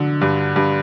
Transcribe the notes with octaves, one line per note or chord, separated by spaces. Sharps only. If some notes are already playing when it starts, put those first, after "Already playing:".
Already playing: D3 F#3
G2
G2